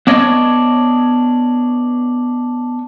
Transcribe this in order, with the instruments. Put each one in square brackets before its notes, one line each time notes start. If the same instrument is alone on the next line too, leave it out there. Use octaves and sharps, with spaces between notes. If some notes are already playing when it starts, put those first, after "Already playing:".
[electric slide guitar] B3 D4 C#5 D#5